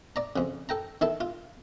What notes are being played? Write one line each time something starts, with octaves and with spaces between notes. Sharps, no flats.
D5 A#5
F2 C#3
A4 G5 A#5
D#3 E4 A4
F4